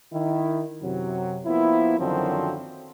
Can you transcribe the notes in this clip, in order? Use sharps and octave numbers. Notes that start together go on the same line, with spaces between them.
D#3 E4
F#2 C3 F#3
F3 A#3 B3 E4
F#2 D3 D#3 F3 F#3 C4